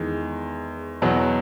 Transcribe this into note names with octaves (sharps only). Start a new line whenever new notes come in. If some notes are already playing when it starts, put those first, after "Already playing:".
Already playing: E2 D#3 G#3
E2 B2 F#3